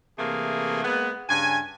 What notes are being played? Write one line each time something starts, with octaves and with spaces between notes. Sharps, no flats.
C3 E3 A3 A#3 G#4
G#3 A#3 B3
G2 C#3 G#5